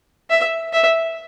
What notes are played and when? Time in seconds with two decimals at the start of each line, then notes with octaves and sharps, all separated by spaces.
0.30 E5
0.73 E5